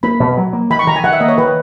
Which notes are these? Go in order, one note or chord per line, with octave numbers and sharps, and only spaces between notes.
A#3 B5
B2
F#3
A#3
D#3 B5
C#6
D#3 A#5
G#5
D#3 F#5
E5
A#3 D#5
C#5
D#3 B4